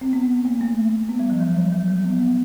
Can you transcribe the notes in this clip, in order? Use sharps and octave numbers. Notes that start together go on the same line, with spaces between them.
C4
B3
A#3
A3
B3
G3
F3
F#3
G3
F#3
F#3
B3
B3